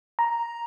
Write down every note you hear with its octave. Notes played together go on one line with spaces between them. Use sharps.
A#5